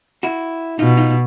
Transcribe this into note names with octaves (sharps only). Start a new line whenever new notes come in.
E4 F#4
B2 D#4 F4
D#4 F4